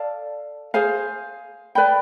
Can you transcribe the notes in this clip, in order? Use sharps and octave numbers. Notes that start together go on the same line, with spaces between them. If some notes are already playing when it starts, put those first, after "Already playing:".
Already playing: A4 D5 F5 A5
G#4 C5 F5 G#5
B4 D5 G5 B5